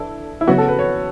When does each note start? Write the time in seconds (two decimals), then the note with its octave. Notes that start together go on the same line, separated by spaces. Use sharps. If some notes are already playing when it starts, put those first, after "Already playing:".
Already playing: E3 D4 E4 A4
0.41 E4
0.47 C#3 F#3 B3 F#4
0.58 A4
0.68 B4
0.79 C#5